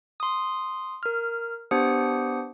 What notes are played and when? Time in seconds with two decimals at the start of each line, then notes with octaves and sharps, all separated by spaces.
0.20 C6 D#6
1.03 A#4 F6
1.71 B3 D4 G4 C5 D#6 C#7